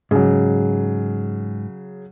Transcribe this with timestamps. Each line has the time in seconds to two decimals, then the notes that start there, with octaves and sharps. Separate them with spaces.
0.11 G#2 C#3 F#3